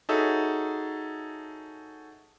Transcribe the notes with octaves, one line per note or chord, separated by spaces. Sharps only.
D#4 F#4 G#4 A4 C#5 E5